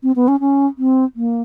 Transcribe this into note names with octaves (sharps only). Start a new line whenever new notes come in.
C4
B3
C#4
C#4
C4
A#3